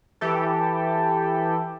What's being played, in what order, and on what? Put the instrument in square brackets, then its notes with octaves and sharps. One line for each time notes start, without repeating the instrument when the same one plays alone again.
[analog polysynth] E3 G4 A4